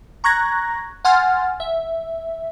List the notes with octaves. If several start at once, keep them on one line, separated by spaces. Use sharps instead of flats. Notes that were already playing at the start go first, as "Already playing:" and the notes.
A#5 C#6 F#6 G#6 A#6
F#5 G#5 C6 F6 A6
E5